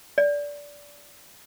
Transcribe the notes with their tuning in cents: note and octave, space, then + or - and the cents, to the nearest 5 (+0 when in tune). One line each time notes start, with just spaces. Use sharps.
D5 -20